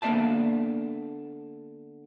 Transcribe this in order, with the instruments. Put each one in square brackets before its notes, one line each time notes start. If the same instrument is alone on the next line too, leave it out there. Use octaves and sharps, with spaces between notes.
[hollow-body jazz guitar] D3 A#3 B3 D5 E5 A5